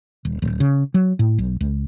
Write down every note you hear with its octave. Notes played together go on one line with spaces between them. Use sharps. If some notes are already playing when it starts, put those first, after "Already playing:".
D#1
D1
C#3
F#3
A2
B1
C#2